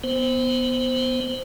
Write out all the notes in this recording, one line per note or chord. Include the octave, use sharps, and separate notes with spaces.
B3 C5